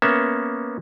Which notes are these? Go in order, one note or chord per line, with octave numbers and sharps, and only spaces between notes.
A#3 B3 C#4 E5